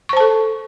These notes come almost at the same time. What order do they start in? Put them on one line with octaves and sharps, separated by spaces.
C#6 C5 A5 A4